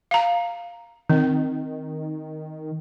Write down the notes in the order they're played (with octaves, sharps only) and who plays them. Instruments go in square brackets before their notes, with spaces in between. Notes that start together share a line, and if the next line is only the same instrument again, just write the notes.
[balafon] F5 A#5
[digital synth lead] D#3 [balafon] C4